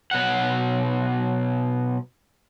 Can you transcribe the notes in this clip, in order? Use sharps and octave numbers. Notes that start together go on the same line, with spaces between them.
B2 F#3 F#5